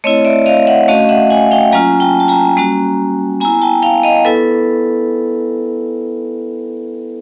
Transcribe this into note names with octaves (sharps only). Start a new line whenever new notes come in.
A3 C4 E4 C#5 D#5
D5 E5
D#5 F5
E5 F#5
A3 C#4 F#4 D#5 F5
E5 F#5
F#5 G#5
F5 G5
F#3 A#3 C#4 F4 G#5 A#5
G5 A5
A5
G#5 A#5
G3 A#3 C#4 F#4
B3 E4 G#5 A#5
G5 A5
F5 G5
D#5 F5
B3 E4 A4 B4